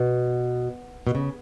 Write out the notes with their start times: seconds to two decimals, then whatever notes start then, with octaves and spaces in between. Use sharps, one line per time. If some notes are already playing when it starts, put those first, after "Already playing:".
Already playing: B2
1.07 B2
1.15 C#3